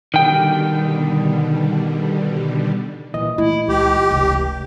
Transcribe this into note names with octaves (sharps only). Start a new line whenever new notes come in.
B2 D3 D#3 G3 G5
A#1 A#2 E3 D#5
A3 E4
C#2 G4
F1 C#2 C#3